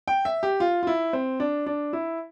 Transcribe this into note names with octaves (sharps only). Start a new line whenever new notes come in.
G5
E5
G4
F4
F4
E4
C4
D4
D4
E4